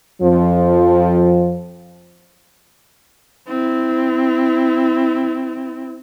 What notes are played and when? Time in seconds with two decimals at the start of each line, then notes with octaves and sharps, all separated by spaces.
0.21 F2 F3
3.48 C4 E4